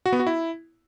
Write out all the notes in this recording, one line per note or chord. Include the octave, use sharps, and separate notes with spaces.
F#4
B3
F#4
E4